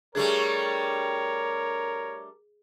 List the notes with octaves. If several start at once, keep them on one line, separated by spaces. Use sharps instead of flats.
G3 A3 D4 G#4 A#4 C#5